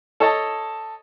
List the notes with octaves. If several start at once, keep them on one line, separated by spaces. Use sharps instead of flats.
A4 C#5 D#5 A5